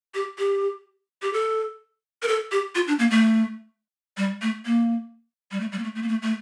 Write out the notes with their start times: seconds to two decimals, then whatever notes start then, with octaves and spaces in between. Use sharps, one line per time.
0.14 G4
0.38 G4
1.22 G4
1.33 A4
2.22 A#4
2.28 A4
2.52 G4
2.75 F4
2.87 D4
2.99 A#3
3.11 A3
4.17 G3
4.42 A3
4.65 A#3
5.51 G3
5.60 A3
5.72 G3
5.79 A#3
5.84 A3
5.95 A3
6.03 A#3
6.08 A3
6.22 A3